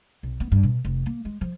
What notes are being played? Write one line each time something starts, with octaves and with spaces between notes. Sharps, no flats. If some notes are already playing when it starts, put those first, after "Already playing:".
B1
B3
G2
B2
F1
A#3
G#3
F3